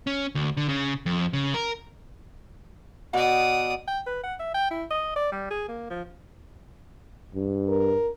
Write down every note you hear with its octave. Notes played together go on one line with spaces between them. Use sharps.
C#4
D2
D3
C#3
F2
C#3
A#4
B2 D5 F#5 D#6
G5
B4
F#5
E5
G5
E4
D#5
D5
G3
G#4
A#3
F3
G2
A#4